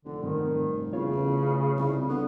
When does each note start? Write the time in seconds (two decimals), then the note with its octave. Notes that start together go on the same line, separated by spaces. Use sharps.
0.05 F1 D3
0.23 G#2 D#3 G3 C4
0.93 E2 C#3 F4 C#5
1.11 A1
1.76 C2
2.09 D3 B3